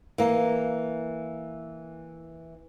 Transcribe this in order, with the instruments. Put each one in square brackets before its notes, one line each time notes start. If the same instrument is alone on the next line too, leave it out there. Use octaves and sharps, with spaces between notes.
[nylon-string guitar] E3 A#3